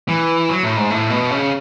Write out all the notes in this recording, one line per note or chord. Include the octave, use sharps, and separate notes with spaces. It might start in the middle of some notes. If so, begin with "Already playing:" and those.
E3
F#3
A2
G#2
A2
B2
C#3